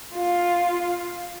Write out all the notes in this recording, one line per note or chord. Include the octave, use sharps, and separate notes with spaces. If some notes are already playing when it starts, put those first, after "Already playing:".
F4